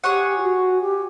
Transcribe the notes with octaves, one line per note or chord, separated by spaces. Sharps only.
G4 G#4 C#5 F#5
F4
F#4
G4